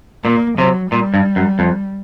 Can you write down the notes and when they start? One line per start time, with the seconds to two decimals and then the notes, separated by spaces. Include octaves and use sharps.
0.24 A#2 A#3
0.58 C3 F#3
0.91 A#2 G3
1.14 G2
1.36 F#2
1.59 F2